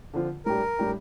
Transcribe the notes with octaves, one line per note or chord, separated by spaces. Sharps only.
D3 F3 C4 F4
A2 G3 D4 G4 A#4
A2 G3 D4 G4